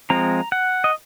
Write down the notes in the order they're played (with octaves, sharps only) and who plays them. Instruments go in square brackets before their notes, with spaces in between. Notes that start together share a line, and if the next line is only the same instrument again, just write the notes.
[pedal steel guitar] F3 G#3 C4 A#5
F#5
D#5